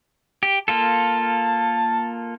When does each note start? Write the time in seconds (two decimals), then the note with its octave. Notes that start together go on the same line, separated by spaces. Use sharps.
0.43 G4
0.68 A#3 F4 A4 A5